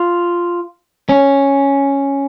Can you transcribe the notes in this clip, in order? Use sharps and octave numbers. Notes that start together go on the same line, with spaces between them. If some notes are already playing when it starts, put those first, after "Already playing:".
Already playing: F4
C#4